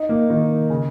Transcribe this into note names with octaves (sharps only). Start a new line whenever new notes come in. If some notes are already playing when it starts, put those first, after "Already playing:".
Already playing: D#4
A#3
D#3
C#3